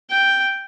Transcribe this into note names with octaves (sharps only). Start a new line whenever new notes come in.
G5